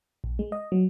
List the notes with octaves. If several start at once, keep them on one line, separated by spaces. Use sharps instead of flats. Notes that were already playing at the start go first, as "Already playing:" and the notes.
A#1
G#3
D#5
F#3